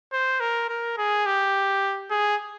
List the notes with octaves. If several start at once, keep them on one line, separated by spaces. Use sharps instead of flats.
C5
A#4
A#4
G#4
G4
G#4